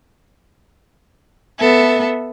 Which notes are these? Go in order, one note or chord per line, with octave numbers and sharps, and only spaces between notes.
B3 A4 E5